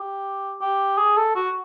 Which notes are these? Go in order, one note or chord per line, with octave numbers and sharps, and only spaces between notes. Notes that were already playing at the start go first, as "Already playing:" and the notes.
Already playing: G4
G4
G#4
A4
F#4